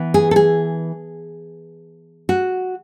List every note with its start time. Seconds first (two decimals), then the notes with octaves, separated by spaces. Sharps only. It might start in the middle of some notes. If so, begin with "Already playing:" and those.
Already playing: E3 B3
0.14 G#4
0.31 A4
0.36 G#4
2.29 F#4